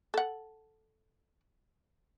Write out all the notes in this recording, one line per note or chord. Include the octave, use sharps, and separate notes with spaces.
A4 F#5